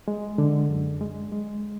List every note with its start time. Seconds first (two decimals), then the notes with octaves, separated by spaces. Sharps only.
0.08 G#3
0.38 D3
0.70 F#2
1.01 G#3
1.32 G#3